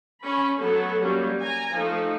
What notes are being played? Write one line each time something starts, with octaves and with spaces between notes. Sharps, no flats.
C#4 B5
F#3 A3 B3 A4
F#3 G3 A#3 C#4
G#5 A#5
F3 A3 D#4 A4